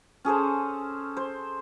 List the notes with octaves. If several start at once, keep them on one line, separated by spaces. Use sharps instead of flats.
C#4 G#4 A4 C5
C5